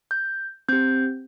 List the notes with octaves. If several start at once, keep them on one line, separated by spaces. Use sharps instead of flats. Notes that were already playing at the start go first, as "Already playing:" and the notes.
G6
C4 G4 G6